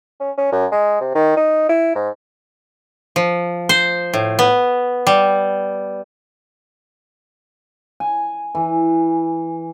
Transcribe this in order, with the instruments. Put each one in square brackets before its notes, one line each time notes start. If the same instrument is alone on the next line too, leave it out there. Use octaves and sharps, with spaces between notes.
[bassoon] C#4
C#4
F#2
G#3
C3
D#3
D#4
E4
G#2
[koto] F3
C5
A2
B3
G3
[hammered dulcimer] G#5
E3